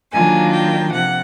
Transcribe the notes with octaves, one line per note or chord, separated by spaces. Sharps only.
D#3 F#3 A#3 D4 F4 G#5
G5
C3 F3 F#5